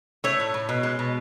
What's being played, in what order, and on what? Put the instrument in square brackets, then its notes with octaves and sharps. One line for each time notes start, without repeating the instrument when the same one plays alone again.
[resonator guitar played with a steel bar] A3 C#5
A2
A2
B2
G#3
B2